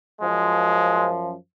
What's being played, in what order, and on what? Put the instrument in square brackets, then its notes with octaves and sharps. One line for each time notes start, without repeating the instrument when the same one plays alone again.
[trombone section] F#2 F3 [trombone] G#3